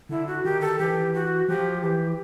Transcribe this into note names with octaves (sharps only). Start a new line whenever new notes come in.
D3 E4
F#4
D#3 G4
A4
E3 G4
F#4
F3 G4
E3 G4